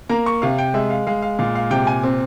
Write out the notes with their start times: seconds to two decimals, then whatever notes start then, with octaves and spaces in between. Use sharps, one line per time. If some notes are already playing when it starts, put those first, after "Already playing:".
0.09 A#3 A#5
0.26 C#6
0.42 C3 F5
0.58 G5
0.74 G#3 E5
0.90 F5
1.07 G#3 F5
1.22 F5
1.39 A#2 F5
1.55 F5
1.70 C3 G5
1.87 G#5
2.04 C4